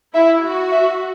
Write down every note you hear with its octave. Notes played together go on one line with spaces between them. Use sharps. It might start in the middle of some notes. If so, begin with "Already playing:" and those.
E4 E5
F#4
E5